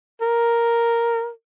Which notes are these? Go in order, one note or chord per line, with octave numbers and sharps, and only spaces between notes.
A#4